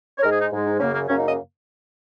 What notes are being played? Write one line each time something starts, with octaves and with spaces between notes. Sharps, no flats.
C#5
G#2 G#3 A#4
G#4
D#4
G#2 G#3
D#4
F#2 C#3 A#3 C#4
A#3
F#2 C#3 A#3 C#4
D#4
D#5